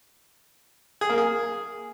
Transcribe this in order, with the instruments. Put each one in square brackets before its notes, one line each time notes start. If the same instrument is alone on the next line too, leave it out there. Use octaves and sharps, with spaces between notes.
[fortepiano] G#4
A#3
G#4